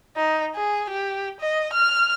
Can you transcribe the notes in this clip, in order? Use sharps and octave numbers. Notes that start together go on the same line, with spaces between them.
D#4
G#4
G4
D#5
F6